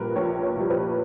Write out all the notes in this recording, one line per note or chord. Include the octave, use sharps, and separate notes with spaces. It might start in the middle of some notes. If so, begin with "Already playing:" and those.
Already playing: A#1 A#2 G3 A#4 B4
A#1 C#5
C#5
A#2 G3
B4